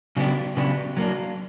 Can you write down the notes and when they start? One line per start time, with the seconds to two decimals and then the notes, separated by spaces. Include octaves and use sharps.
0.17 C#3 F#3 B3 D4 G4
0.57 C#3 F#3 B3 D4 G4
0.97 F#3 A#3 D4